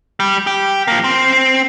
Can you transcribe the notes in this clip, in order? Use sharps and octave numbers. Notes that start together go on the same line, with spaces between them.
G3
G4
F3 A#3
C4